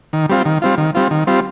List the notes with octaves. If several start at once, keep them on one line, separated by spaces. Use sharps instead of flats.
D#3
G3 C4 F4
D#3
G3 C4 F4
D#3
G3 C4 F4
D#3
G3 C4 F4